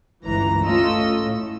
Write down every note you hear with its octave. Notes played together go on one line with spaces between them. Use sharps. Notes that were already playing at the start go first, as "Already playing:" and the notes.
G1 C#2 E3 A#5 A#6
A3 C#4 F4 D#5 E6
A2